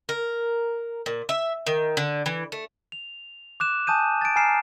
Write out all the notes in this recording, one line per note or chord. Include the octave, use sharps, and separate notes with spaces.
A#4
A#2
E5
D#3
D3
E3
A3
F7
D6 F#6 E7
G#5 A5 D#6 G6 D#7
A6 D7
G#5 A#5 F6 C7 D7 E7